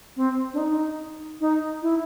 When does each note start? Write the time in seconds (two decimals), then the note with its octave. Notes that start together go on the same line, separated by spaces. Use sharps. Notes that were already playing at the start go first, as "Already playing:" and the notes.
0.16 C4
0.54 D4
0.58 D#4
1.41 D#4
1.82 E4